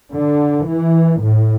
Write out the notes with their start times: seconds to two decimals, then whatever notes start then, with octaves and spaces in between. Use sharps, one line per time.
0.13 D3
0.67 E3
1.22 A2